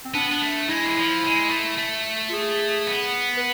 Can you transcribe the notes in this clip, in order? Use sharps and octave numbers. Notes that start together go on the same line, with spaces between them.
C4
B3 D4
B3
A3
G#3 E4
E3
F3
G#3
A3
A3
F4
G#4
B3
B4